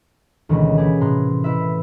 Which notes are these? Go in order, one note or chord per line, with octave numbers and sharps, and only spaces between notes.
D2 B2 D#3 E3 G#3 C#4
E3 E4 G4 G#4
A2 C3 A#5 C6 F#6
E4 B4 E5